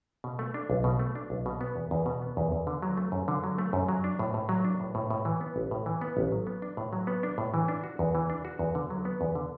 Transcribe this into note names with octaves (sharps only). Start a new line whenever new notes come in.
B2
A3
D4
B1
B2
A3
D4
B1
B2
B3
E2
E2
B2
B3
E2
E2
D3
F#3
A3
F#2
D3
F#3
A3
F#2
F#3
D4
A2
A2
F#3
D4
A2
A2
A2
E3
B3
A1
A2
E3
B3
A1
F#3
B3
D4
A2
F#3
B3
D4
A2
E3
D4
F#4
E2
E3
D4
F#4
E2
D3
F#3
B3
E2
D3